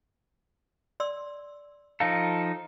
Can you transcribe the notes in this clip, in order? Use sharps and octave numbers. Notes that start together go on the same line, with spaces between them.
D5 C6 E6
F3 D#4 A4 F5